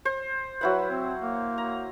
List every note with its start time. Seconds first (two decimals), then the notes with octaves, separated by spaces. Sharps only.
0.05 C5
0.61 F#3 E4 B4 F#5
0.90 C4
1.20 A#3
1.58 A#5